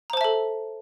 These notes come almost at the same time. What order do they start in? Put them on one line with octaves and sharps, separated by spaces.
A#5 C5 A5 E5 A4